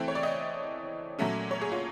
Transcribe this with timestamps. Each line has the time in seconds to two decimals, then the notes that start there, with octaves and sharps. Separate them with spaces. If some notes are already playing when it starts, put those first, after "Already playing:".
Already playing: E3 A3 C4 G5
0.08 C#5
0.15 D5
0.23 D#5
1.19 A#2 F#3 A3 C#4
1.51 C#5
1.61 G#4
1.72 F4